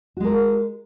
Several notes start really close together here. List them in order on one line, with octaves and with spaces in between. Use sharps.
F#4 G#3 A#4